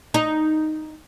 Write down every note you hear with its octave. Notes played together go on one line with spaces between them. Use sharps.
D#4